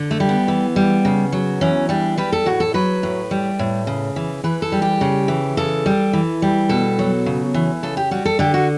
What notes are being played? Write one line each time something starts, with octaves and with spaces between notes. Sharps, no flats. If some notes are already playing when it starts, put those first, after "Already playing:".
Already playing: D3
A3
G3
B3
E3
G3
C#3
F#3
E3 C#4
G3 D4
G3 B4
A4
A2 F#4
A4
F#3 B4
A2
G3
A2
C#3
E3
E3 B4
A4
G3
G4
C#3
E3
C#3 A4
G3
E3
G3
B2 A4
F#3
C#3
E3
C#3 A4
G4
G3 F#4
A4
D3 G4
F#4